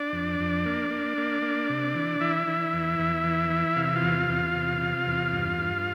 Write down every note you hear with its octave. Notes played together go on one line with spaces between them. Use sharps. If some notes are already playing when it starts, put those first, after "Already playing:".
Already playing: D4 D5
F2
F2
A#3
A#3
A#3
A#3
C3
E3
E3 E4 E5
E3
E2
E2
E3
E3
C3 F5
E5
F4 F5
E2
E2
C3
C3
E2
G2
G2